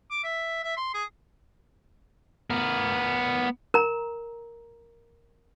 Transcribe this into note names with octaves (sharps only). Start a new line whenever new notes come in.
D6
E5
E5
C6
G#4
B3 A#4
A#4 A#5